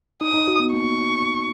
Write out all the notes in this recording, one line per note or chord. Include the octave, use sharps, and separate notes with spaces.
D#4 D#6
D#4
F#4
B3
A#3 C#6